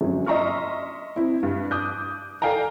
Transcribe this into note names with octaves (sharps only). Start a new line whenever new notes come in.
G1 F#3 C#4
D#5 E5 A#5 C6 C#6 F6
C4 E4
G2
D6 D#6 F#6 G6
A4 D5 F5 G5 G#5 A#5